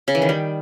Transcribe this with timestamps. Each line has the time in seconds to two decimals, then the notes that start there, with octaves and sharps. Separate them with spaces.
0.08 C#3
0.15 E3
0.22 D#3
0.29 G3